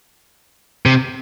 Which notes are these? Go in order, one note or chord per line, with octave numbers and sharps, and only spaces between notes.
C3